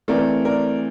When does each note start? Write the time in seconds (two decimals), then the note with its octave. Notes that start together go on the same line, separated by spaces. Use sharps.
0.08 E3 A3 C4 A#4 D5
0.45 A#4 D5